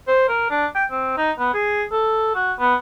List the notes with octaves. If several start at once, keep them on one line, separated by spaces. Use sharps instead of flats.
C5
A#4
D4
G5
C4
D#4
B3
G#4
A4
F#4
B3